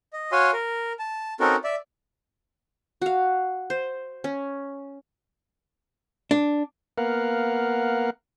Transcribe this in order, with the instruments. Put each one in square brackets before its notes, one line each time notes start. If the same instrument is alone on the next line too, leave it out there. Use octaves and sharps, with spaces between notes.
[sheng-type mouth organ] D#5
F#4 C#5 F5 G#5 C6
A#4
A5
C4 C#4 D#4 F#4 A4 A#4
D5 E5
[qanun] F#4 F5
C5
C#4
[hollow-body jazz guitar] D4
[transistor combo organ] A#3 B3 A#4 F5 F#5